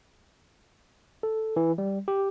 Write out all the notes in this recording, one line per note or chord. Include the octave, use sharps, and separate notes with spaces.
A4
E3
G3
G4